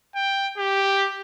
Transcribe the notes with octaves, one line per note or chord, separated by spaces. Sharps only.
G5
G4